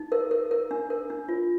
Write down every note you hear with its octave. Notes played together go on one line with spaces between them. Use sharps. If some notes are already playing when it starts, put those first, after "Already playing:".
Already playing: D#4
A#4
A#4
A#4
D4
A#4
D4
F4